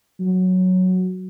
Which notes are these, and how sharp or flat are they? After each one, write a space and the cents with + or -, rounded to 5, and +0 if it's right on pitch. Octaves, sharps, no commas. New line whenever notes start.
F#3 -5